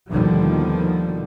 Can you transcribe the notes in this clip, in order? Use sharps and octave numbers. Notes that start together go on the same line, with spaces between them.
D#2 B2 D3 D#3 F3 G3